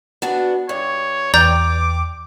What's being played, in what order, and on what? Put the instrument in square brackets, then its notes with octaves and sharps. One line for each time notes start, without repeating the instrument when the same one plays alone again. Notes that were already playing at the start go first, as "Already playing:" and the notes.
[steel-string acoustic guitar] B3 D4 F#4
[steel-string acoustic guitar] G2 [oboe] C#5
[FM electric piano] E2 G5 [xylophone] D5 A#5 G6 [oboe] D6